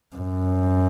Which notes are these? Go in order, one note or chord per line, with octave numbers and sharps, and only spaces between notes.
F#2